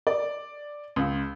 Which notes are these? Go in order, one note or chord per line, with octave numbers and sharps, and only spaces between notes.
D5
C#2